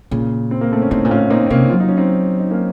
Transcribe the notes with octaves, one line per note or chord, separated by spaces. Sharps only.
A#2 C#3
C4
A#3
A3 C4
C#4
A2 C4 D#4
A#2
A2 C#4 F4
A#2 C4 D#4
C4
C3 A#3 C#4
F#3 F4
D#4
C#4
C4 D#4
D#4
A#3 C#4